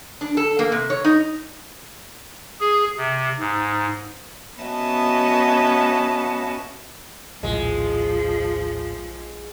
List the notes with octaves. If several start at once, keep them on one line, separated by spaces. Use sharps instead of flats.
D4
A4
A#3
C3
C#5
D#4
G#4
C3
G#2
B3 C#4 F#4 D#5 E5 A5
A#1 D#2 A2 F3 G#3